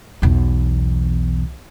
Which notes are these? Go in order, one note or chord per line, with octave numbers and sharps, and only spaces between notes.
B1 E2